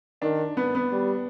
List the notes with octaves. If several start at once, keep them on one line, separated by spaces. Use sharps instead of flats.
D#3 D4
B3
B3
G3